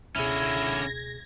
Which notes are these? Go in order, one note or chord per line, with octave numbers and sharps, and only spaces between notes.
C#2 B2 D3 C#4 E4 G#4 G#6 A#6